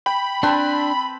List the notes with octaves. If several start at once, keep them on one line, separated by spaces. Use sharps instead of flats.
G5 B5
C4 D4 B4 A5